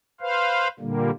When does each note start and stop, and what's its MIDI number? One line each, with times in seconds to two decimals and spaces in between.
0.21 0.68 71
0.21 0.68 72
0.21 0.68 77
0.80 1.10 46
0.80 1.10 50
0.80 1.10 55
0.80 1.10 58